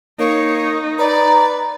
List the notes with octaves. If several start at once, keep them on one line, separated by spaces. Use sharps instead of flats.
A#3 D#4 C#5
B4 D5 A#5